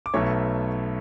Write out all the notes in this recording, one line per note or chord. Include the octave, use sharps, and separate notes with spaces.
D6
B1 B2 A3 C#5 C#6